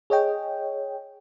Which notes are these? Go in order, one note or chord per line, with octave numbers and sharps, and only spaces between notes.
G#4 C#5 D#5 G5